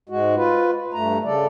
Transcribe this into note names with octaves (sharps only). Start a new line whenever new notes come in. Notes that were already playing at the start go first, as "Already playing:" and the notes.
G#2 G#3 F#4
F4 B4
G2 A3 A#5
C#3 A4 D5